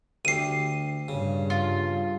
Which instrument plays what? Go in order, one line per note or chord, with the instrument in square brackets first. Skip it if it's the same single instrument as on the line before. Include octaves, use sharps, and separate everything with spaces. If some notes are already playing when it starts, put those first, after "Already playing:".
[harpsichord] D2 G4 [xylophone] C7 D#7
[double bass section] G2 [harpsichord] C#3
[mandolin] F4